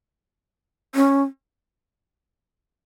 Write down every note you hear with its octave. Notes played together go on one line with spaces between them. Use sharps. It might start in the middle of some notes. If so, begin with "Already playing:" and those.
C#4